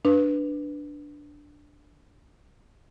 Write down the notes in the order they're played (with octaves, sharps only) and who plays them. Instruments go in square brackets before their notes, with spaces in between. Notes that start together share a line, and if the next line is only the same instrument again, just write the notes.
[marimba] D4 B4